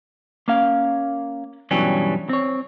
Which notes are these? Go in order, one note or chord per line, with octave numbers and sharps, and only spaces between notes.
A#3 C#4 F5
G2 B2 E3 F#3 G3 C#4
C4 C#5